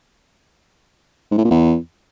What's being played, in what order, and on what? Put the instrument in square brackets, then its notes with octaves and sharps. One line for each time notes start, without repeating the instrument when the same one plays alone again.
[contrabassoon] G#2
A2
A#2
E2